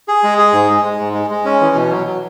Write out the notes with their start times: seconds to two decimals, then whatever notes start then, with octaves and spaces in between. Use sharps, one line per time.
0.08 G#4
0.23 G#3
0.38 G#4
0.53 G#2
0.69 G#3
0.85 G#3
1.00 G#2
1.14 G#3
1.30 G#3
1.45 C#4
1.61 E3
1.76 B2
1.91 F#3
2.07 F#3